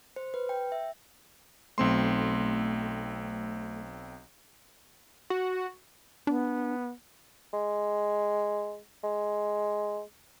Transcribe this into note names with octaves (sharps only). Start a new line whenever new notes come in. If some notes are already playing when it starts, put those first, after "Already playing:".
C5
B4
G5
E5
B1 A3 C4 C6
F#4
B3 D4
G#3
G#3